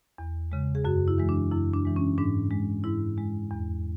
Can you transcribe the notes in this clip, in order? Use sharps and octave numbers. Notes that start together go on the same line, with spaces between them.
E2
C#3 G#3
G#4
F#2 F#4
E4
E3 G#3
D4
F#2 E4
D4
E3 G#3
C#4
G#2 D4
G#3
G#2 E4
G#3
E2